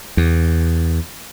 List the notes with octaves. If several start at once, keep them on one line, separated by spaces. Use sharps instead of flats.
E2